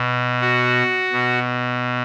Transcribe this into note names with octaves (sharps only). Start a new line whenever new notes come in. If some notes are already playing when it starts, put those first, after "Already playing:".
Already playing: B2
F#4
B2